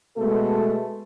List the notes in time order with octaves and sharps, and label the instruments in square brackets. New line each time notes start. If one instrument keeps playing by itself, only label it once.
[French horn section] B2 G#3 A3 A4